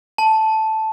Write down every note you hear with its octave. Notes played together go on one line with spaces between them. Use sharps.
A5